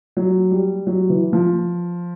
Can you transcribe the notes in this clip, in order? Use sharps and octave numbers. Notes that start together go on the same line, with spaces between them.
F#3
G3
F#3
E3
F3